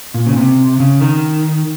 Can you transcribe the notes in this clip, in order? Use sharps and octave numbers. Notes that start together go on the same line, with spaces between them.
A#2
C#3
C3
C#3
D#3